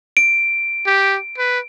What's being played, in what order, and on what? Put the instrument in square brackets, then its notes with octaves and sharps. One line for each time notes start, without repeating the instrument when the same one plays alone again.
[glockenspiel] D7
[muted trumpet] G4
B4